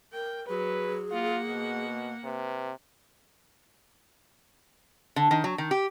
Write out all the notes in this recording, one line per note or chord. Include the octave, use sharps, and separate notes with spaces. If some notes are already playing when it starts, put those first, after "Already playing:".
A#4 G5
F#3 G#4 B4
A#3 F4 F#5
B2
C3 B4
D3
D#3
F#3
D#3
G4